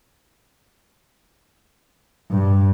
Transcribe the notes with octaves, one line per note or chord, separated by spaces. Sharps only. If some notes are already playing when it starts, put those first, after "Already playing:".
G2